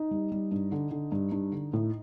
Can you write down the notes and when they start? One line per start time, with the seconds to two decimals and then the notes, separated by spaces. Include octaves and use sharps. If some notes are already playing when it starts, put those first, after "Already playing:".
Already playing: D#4
0.11 G3
0.32 G3
0.51 G2
0.72 D3
0.91 D3
1.12 G2
1.32 G2
1.52 D3
1.73 A2